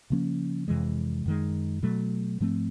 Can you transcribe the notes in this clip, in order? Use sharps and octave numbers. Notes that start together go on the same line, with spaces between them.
C#3 F3 A#3 C#4
F2 C3 E3 G#3
F#2 D#3 G#3
B2 F#3 A3
G#2 F3 A3 C4